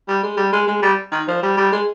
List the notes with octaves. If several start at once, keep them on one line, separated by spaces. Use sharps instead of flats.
G3
G#3
G3
G#3
G#3
G3
D#3
F3
G3
G3
G#3